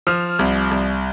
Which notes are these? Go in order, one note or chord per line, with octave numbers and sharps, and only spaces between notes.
F3 F6
C2
C2